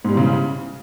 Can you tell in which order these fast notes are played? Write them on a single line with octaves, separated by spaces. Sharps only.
G#2 G3 E3 C#3